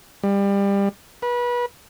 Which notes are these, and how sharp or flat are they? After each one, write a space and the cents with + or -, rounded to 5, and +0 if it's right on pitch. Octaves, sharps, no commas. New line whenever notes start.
G3 +25
B4 -30